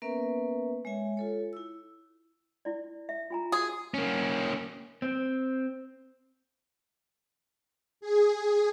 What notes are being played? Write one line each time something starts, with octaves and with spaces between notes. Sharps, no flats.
A#3 B3 C#4 A#4 B4 E5
G#3 C#5 E5 G#5
F4 A4 C#5
E4 E6
E4 D5
E5
F4 G#5 A#5
F#4 G#4
A#3 C#4
C4
G#4